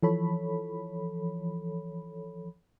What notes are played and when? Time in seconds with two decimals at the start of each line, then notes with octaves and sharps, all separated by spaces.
0.03 E3 F3 A4 C#5 B5